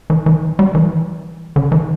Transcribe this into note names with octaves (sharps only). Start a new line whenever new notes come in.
E3
E3
G3
E3
D3
E3